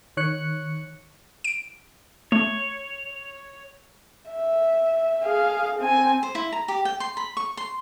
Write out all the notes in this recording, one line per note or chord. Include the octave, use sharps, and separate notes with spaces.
D#3 C#5 F#6 C#7
D7
A3 C#5
E5
G#4 F5
C4 G#5
C5
E4
A#5
G4
G5
C6
B5
C#6
C6